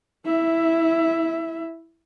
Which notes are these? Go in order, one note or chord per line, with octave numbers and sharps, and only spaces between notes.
E4 E5